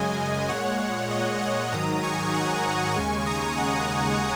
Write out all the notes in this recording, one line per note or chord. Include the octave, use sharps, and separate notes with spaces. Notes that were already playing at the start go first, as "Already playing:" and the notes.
Already playing: F#2 C#3 G#3 D#5 G#5
A#2 G#3 C#5 F#5
D#5
C#5 F#5
G#2 D#3 F#3 A#5 D#6
G#5 C#6
F#5 A#5
D#2 C#3 G#3 G#5 C#6
A#5 D#6
F#5 A#5